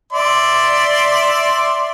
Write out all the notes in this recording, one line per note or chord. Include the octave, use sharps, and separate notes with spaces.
D5 E5 C6